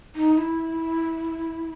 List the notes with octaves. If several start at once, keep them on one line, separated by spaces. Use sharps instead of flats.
D#4
E4